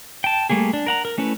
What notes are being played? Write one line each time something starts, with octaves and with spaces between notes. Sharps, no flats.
G5 A5
G3 A3 A#3 G#4
D4
A#4 F#5 A#5
A#4
A3 C#4 E4 B4